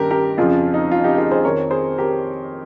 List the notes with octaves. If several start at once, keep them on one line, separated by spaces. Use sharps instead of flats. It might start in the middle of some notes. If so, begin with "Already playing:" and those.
Already playing: G2 D#3 G4 A#4
G4 A#4
F2 C#3 F3 F4 G#4
D#4
F4
D#4 G4
F4 G#4
G#4 C5
F2 D#3 A#4 C#5
G#4 C5
G4 A#4